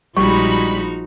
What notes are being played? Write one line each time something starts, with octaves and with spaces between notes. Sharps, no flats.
A#1 F3 G3 G#3 D#4 F#4 B5 C#6